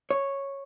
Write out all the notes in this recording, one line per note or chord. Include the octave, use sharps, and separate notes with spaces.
C#5